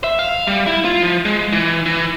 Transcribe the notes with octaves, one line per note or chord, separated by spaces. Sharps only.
E5
F5
G3
E4
F4
F3
G#3
E3
E3